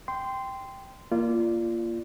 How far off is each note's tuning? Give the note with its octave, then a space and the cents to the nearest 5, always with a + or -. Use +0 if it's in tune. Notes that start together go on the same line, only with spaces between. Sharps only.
G5 +0 C6 -15
A#3 +5 F4 -25 D5 +0